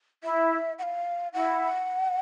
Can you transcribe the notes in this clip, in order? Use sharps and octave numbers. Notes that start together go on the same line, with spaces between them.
E4 E5
F#5
F5
E4 F#5